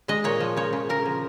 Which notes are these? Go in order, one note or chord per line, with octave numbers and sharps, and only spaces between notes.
G#3 D#5
A#2 C#5
F3
C#3 C#5
C#3
C#3 A#4
F3